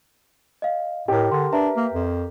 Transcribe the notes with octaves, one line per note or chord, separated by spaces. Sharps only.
D#5 F5
A2 G4 A#4 D#5
D3 C6
D4 B4 E5 A#5
A#3
F2